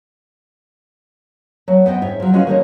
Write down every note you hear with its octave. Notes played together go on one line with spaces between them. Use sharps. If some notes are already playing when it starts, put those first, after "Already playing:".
F#3 A3
B3 C5 D#5 G5
G#2 C#5 E5
F3 F#3
G#3 C#4 F#4 B4 D#5 F5
D#3 A#3 F#4 A4 A#4 C#5